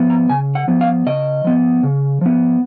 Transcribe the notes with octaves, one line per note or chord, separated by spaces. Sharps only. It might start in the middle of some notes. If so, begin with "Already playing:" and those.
Already playing: F3 B3
A#5
C#3 G#5
F#5
F3 B3
F5
C#3 D#5
F3 B3
C#3
F3 B3